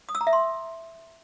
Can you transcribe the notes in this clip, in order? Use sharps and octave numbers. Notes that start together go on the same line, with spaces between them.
D#6
E6
A#5
E5
C6